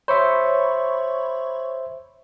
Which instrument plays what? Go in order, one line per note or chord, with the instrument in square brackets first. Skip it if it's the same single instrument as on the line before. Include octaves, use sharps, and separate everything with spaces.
[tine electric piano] C5 E5 [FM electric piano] C#5 B5 C#6